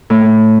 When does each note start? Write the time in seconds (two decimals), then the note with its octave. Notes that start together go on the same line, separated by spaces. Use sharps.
0.10 A2